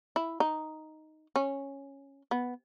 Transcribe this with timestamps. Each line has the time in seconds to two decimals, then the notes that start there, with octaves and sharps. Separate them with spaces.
0.16 E4
0.40 D#4
1.36 C#4
2.31 B3